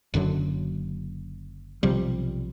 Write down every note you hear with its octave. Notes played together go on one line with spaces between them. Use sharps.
F#1 F#2 D3 F#3
B1 C3 F3 G3